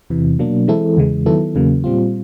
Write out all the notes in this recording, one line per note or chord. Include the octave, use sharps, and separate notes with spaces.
E2 C3 E3
B2 F#3 A#3 D4
E3 G#3 C4 E4 A4
E2 C#3 E3 G#3
D#3 F#3 B3 E4 A4
E2 C#3 F#3 A#3
A#2 G3 C4 F4